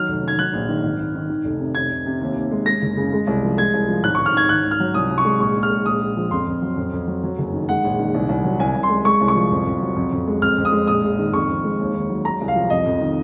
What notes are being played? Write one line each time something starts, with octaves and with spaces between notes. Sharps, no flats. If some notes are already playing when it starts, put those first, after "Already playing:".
Already playing: D#3 F#3 F6
F1
D#3 G#6
F#3 F#6
A#1
D#3
G#1
G#1
D#3
D#3
F1
C3
F1 G#6
F1
C3
D#2
D#2
G#3
G#3 A#6
F#1
C#3
G#3
C2
F3
G#3 G#6
C2
F3
G#1 F#6
G#1 C#6
F6
D#3 G#6
G#1 F#6
G#1
F6
F#3
C2 D#6
C2
C#6
G#3
A#1 C#6
A#1
F6
G#3
A#1 D#6
A#1
F3
F2 C6
F2
F#3
F2
F2
F#3
F#3
F#1
D#3
G#3 F#5
A#1
D#3
C2
C2
F#3
C2 G#5
C2
C6
G#3
G#3 C#6
C2
C#6
F3
F2
F2
F#3
F2
F2
G#3
F2 F6
F2
D#6
G#3
A#1 D#6
A#1
D#3
F2 C#6
F2
G#3
D#2
D#2
F#3
G#3 A#5
C2
F5
F3
F2 D#5
F2
D#3